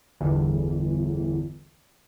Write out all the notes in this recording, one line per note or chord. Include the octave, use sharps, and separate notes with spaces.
G1 E2